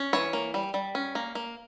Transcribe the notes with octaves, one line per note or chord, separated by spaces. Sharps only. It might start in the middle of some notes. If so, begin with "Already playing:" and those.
Already playing: C#4
E3 C#5
A#3
G3
G3
C#4
A#3
A#3